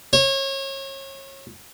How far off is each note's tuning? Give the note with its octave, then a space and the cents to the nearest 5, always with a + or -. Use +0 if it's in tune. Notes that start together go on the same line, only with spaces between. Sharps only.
C#5 -30